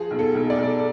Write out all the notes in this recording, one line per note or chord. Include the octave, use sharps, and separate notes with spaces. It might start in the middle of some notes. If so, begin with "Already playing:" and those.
Already playing: F3 G#4
B1
A4
B1
D5
B1